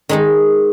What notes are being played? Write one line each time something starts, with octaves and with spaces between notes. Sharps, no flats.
D#3 G#3 D#4